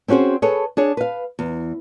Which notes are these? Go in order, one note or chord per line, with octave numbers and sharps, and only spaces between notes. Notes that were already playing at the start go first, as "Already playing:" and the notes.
C4 C#4 F#4 G#4 C5
G#4 A4 B4 C#5
D4 G#4 C#5
B4 F5
E2